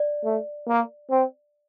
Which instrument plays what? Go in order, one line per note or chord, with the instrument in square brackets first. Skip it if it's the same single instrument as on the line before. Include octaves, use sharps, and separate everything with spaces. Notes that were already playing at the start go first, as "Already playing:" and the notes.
Already playing: [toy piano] D5
[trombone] A3
A#3
C4